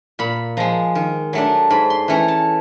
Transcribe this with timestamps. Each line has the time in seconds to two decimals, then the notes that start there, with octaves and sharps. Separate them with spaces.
0.19 A#2 B5
0.57 F3 G#3 A#5
0.95 D#3
1.33 F#3 A3 D4
1.70 G#2 B5
1.90 C6
2.08 E3 A3 C#4 A#5
2.28 A5